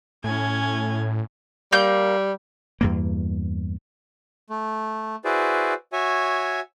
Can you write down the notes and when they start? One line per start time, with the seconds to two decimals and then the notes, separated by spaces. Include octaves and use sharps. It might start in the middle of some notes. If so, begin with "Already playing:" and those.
0.24 A2 C#4 G#5
1.72 G3 A#3 G6
2.81 E2 G2 A#3
4.50 A3
5.25 E4 F#4 G#4 B4 C5 D5
5.93 F#4 C#5 E5 G#5